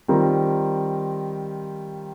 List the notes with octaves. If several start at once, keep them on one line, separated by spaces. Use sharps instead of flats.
D#3 G3 C4 F4 A#4